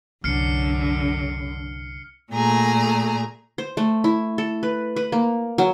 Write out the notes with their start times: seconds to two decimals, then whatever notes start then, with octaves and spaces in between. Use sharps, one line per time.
0.24 C2 F#2 D3 F6 C7 C#7
2.31 A#2 A3 G#4 A#5
3.58 C5
3.77 A3
4.04 E4
4.38 A4
4.63 B4
4.96 B4
5.12 A#3
5.58 F#3